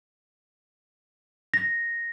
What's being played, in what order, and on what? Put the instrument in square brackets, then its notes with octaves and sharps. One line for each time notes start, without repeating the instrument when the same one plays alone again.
[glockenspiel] A#6